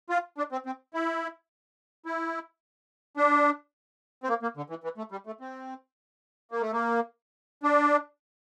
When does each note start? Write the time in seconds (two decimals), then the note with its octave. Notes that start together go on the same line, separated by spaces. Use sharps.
0.10 F4
0.38 D4
0.52 C4
0.66 C4
0.94 E4
2.06 E4
3.17 D4
4.23 C4
4.29 A#3
4.43 A#3
4.57 D3
4.70 E3
4.84 E3
4.98 A3
5.12 G3
5.27 A3
5.41 C4
6.51 A#3
6.61 A3
6.73 A#3
7.63 D4